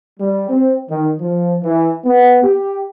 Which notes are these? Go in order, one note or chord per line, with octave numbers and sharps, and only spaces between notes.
G3
C4
D#3
F3
E3
B3
G4